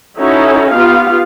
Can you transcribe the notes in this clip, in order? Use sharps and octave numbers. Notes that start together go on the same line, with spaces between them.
C#4 D#4 E4 F#4 A4
B3 F4 G4 F5